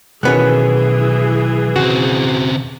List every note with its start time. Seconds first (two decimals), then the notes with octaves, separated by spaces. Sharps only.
0.23 B1 B2 D#3 E3 B3 C#4 G#4 F#6
1.76 C#3 C4 F#4